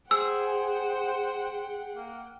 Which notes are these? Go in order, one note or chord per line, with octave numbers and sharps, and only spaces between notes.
G#4 C5 F#5 G5 E6
A#3